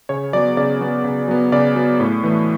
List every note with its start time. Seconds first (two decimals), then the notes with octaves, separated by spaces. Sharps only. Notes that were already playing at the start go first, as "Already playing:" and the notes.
0.09 C#3 C#5
0.33 F#3 B3 D5
0.57 C#3 D5
0.81 F#3 B3
1.04 C#3
1.28 F#3 B3
1.52 C#3 D5
1.76 F#3 B3
2.00 A2
2.23 E3 A3